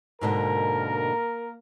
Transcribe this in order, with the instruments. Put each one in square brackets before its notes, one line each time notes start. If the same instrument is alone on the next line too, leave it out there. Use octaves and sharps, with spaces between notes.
[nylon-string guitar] G#2 B2 D3 [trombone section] A#3 A#4